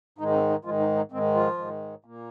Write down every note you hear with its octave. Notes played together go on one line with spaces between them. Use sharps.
G#2 D#3 G#3 D#4
D#4
C4
D#4
G#2 D#3 F3 G#3 F4
D#4
D#4
G#2 D#3 G#3 C4
F3 F4
G#2 D#3 G#3
A#2 A#3